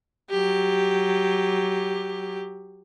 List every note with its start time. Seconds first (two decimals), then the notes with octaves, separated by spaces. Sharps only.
0.31 F#3 G4